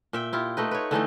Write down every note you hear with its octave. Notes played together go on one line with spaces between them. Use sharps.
A#2 E5 G5
E4 F4 G4
A3 D#4 B4
B4 C#5
D3 E3 A3 D#4